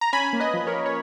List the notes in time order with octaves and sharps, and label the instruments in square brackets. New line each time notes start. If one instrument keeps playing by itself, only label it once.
[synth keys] A#5
C#4 G#5 B5
A#3
B4 D#5
F3
A#4 C#5
A#3
C#5